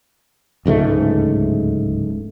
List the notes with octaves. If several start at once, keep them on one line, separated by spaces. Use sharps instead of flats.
D1 C#2 G#2 A3